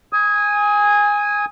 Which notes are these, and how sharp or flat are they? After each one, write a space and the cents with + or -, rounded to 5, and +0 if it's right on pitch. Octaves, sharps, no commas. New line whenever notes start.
G#5 -10 D#6 +25